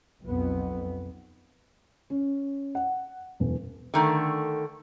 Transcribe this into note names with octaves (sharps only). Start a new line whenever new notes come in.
B1 F2 B3
C#4
F#5
E1
D3 D#3 A3